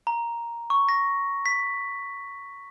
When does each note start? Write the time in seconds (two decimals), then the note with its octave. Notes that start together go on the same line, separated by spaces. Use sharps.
0.07 A#5
0.70 C#6
0.89 A#6
1.46 B6